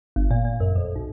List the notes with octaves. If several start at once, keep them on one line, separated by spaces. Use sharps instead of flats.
G1
A#2
A#2
F#2
F2
B1